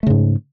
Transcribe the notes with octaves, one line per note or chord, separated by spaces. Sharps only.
G#2 C#3 A3